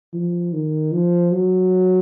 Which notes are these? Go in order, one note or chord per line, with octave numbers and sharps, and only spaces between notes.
F3
D#3
F3
F#3